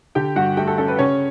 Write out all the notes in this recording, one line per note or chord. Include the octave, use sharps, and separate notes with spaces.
D3 G4 G5
G2 F#4 F#5
A3 G4 G5
A4
C#4 A4
B4
C#3 C#4 C#5